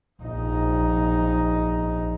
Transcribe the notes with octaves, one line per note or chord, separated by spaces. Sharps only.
A#1 D#4